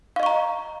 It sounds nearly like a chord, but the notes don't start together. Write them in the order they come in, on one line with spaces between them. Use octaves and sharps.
F5 D#5 C#6 A#5